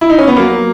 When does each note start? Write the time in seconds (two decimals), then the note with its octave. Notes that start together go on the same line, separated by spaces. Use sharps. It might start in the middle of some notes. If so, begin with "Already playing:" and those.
0.01 E4
0.10 D#4
0.19 C#4
0.28 B3
0.37 F#3 A#3
0.52 F#3